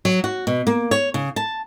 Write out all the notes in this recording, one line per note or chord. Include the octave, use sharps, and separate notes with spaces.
F#3
F#4
B2
A#3
C#5
C#3
A5